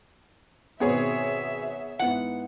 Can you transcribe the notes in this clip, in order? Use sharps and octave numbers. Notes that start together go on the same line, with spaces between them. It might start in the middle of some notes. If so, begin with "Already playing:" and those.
G#1 B2 B3 C4 G#4 C#5 E5
G#2 B3 E4 F#5